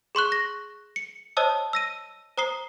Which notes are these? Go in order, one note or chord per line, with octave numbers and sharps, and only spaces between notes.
G#4 C6 C#6 F#6
A#6
C#7
C5 C#5 D#5 A5 D#6 E6
E6 A#6 D#7
C5 A#5 D#6 C7 G7